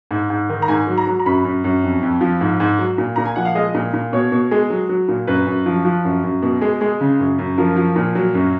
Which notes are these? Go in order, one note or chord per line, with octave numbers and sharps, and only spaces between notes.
G#2
G#2
D#3
A#5
G#2 G#5
F#3
A#5
F#3
A#5
F#2 B5
F#2
F#2
F2
F2
F3
G#2
G#2
F#3
A#2
A#2 A#5
G#5
F3 F#5
F5
G#3 D#5
A#2
A#2
B2 C#5
B2
G#3
F#3
F#3
A#2
F#2 B4
F#2
F3
F3
F#2
F#2
B2
G#3
G#3
C#3
F#2
F#2
F3 A#4
F3
A#2
F#3
F#2